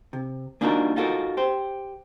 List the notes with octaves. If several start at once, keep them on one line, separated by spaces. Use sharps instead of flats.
C3
A#3 D4 D#4 F4 F#4 A#4
D#4 F4 F#4 A4 A#4
G4 C5